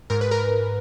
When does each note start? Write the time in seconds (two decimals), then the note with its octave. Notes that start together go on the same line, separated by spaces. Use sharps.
0.10 G#2 A#4
0.21 B4
0.31 A#4